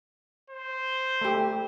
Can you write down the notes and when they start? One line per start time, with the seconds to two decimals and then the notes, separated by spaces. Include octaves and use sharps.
0.50 C5
1.21 A3 G4